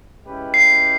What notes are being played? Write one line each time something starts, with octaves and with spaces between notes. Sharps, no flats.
G#3 C#4 E4 G4 B4
C7